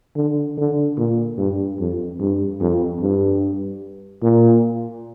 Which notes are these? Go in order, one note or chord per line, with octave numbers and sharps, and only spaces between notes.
D3
D3
A#2
G2
F2
G2
F2
G2
A#2